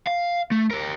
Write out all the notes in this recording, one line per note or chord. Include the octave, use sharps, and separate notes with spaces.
F5
A3
G4 A#4